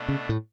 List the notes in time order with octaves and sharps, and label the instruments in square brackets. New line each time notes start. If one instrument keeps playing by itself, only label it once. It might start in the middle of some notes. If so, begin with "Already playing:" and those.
Already playing: [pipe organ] B2 A3 D4
[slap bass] C#3
A2